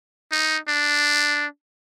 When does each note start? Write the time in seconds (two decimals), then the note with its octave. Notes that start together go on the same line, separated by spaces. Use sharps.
0.32 D#4
0.68 D4